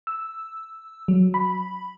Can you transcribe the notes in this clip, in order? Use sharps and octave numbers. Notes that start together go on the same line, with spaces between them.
E6
F#3
B5